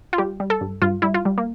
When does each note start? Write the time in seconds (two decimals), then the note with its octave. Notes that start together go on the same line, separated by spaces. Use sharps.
0.13 F4
0.18 G3 G4
0.40 G3
0.50 A4
0.61 G2
0.82 G2 F4
1.02 G3 E4
1.14 F4
1.25 G3
1.38 A#3